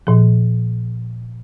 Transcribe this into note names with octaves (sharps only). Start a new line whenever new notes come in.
A#2 F3